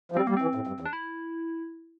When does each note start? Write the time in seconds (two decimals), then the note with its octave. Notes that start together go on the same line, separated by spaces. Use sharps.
0.12 F3
0.16 G3 C4
0.27 G3 A#3
0.37 C4
0.42 E3
0.55 A2
0.67 G2
0.80 E2
0.86 D4
0.93 E4